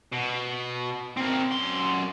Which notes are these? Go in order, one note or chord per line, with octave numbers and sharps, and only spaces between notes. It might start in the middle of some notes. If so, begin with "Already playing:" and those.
B2
C4 A#4
F#2 C6